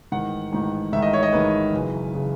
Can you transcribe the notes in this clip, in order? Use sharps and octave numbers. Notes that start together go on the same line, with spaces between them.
A1 G#2 D#3 F#5
A1 G#2 D#3
A1 G#2 D#3 E5
D#5
C#5
D#5
A1 G#2 D#3 B4
F#1 F#2 C#3 E3
C#3 E3